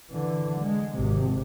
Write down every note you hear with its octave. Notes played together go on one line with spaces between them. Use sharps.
D3 E3
G#3
G#1 C3